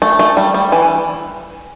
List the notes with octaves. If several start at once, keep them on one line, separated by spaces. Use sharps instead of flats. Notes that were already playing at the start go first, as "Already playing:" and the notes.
A3
A3
G3
G3
E3